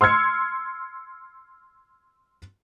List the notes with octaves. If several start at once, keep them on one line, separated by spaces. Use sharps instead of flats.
C6 E6 F6 G#6 C#7